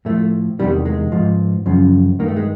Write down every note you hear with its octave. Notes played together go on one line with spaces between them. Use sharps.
A2 F3 A3
E2 C3 D#3 G3
G#3
G#2 F3
F#2 C#3 F3
G2 D#3 A#3
A3
G#3